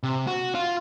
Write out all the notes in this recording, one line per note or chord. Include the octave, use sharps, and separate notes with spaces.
C3
F#4
F4